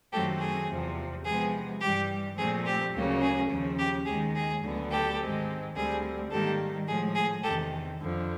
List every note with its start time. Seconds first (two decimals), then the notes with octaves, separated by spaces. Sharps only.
0.12 F#2 D#3 F#3 A3 C4 G4 A4
0.41 G#4
0.68 E2 C3 F3
1.25 C3 F3 G#3 B3 G#4
1.81 G2 E3 G3 G4
2.37 A#2 F3 A3 C4 G#4
2.66 G4
2.93 D2 C#3 F#3 A#3
3.21 G#4
3.49 D#2 C#3 F3
3.78 G4
4.06 D#2 D#3 G#3 G#4
4.35 G#4
4.63 D2 D3 F#3 B3
4.91 G4 A4
5.19 G#2 D#3 G#3 C4
5.75 D2 D3 G3 C4 G#4
6.31 G#2 D#3 G3 A#3 G4 A4
6.87 A2 F3 G#3 G#4
7.15 G#4
7.43 E2 C3 D#3 G4 A4
8.00 F2 D3 F3